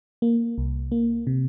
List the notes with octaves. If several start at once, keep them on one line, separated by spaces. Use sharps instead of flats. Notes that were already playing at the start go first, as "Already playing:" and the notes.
A#3
C2
A#3
C3